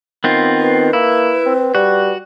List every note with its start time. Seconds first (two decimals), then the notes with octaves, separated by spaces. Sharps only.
0.24 D#3 B3 C4 F4
0.59 B4
0.93 A#3 E4
1.46 C4
1.75 G3 F#4